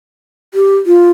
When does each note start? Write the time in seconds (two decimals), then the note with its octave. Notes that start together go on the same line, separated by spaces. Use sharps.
0.54 G4
0.86 F4